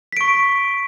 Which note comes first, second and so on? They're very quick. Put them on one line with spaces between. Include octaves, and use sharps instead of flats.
B6 D7 C#6